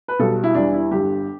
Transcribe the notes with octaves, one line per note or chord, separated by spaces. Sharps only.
B4
B1 B2 G3 A4
E4
E2 E3 G3 D4
E4
G1 G2 D3 G3 G4